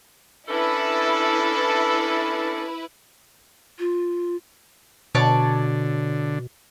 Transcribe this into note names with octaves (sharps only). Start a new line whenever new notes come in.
C#4 D4 E4 A4 B4
F4
B2 D3 C#5 D5 A5